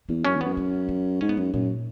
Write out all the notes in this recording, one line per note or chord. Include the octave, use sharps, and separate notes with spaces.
E2 A#3
F#2 C#4
E2
F#2 B3
C#4
D#4
G#2 C#4
B3
F#2 G#3
F#2 A#2